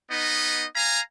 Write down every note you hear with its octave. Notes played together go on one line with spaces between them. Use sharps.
B3 D#4 D#5
F5 G#5 A#5